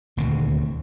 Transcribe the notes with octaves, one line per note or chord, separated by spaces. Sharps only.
D#1 D2 C3